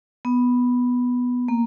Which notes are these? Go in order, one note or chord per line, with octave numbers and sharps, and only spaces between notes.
B3
A#3